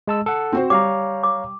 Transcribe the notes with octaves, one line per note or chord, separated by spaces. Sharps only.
G#3 A5 E6
A4 F#5
C4 F#4 C5
G3 C#5 F5 A#5 D6
D6